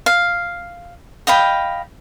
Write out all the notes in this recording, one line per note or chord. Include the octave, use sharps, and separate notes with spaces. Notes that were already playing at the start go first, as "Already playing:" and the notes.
F5
D#5 F5 G5 B5